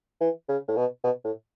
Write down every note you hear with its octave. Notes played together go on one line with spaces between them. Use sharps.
E3
C#3
A2
B2
B2
A2